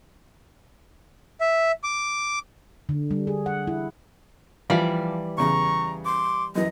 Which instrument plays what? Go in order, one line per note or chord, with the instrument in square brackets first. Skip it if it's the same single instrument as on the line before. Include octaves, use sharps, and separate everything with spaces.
[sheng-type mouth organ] E5
D6
[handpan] D3
G3
G#4
F#5
E4
[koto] E3 G3 D5 [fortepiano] F3 F5
[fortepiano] E2 C#3 [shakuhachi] A#5 [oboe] C#6
[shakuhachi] C6 [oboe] D6
[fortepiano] F#2 E3 [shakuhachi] D#5